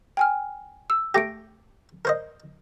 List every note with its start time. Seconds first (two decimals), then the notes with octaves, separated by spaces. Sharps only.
0.17 G5 G#5 F6
0.90 E6
1.14 A3 G4 A#6 D7
2.05 A#4 C5 D#5